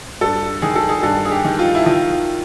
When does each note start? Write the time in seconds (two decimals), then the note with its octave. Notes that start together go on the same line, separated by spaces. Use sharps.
0.21 G2 A4
0.62 D#3 G#4
0.76 A4
0.89 G#4
1.03 G2 A4
1.25 G#4
1.32 G4
1.45 D#3
1.59 F4
1.75 E4
1.86 D#3 F4